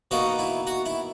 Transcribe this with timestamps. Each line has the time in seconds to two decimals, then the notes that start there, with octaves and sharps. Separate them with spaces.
0.11 B2 A#3 D#4 F#4
0.39 E4
0.67 F#4
0.86 E4